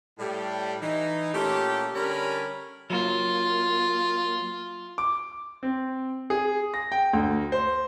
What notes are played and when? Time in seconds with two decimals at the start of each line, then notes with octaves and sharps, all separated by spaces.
0.18 A2 G3
0.81 E3 D#4
1.34 A#2 A3 C#4 G4
1.94 D3 G3 C#4 A#4 G#5 B5
2.90 F#3 A#3 F4
4.98 D6
5.63 C4
6.30 G#4
6.74 A#6
6.92 G5
7.13 D2
7.52 C5